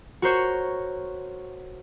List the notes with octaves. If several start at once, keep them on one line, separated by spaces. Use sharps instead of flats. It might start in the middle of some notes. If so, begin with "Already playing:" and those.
F#4 A#4 C5 C#5